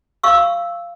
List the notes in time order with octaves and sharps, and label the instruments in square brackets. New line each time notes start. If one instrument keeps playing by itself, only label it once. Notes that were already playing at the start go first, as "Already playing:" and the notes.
[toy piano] F5 C#6 E6